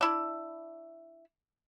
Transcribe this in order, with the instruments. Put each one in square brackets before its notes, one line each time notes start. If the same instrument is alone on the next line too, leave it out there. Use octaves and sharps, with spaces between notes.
[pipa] D4 E4